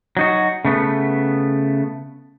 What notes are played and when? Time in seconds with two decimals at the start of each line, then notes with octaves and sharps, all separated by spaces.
0.17 F#3 D#4 F#4
0.65 C#3 A3 B3